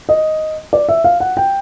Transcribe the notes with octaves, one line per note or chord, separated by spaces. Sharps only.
D#5
D5
E5
F5
F#5
G5